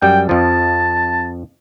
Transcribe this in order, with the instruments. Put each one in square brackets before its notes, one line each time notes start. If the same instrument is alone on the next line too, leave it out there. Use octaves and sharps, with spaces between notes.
[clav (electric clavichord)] F#2 G3 [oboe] G5
[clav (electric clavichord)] F2 F3 [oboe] A5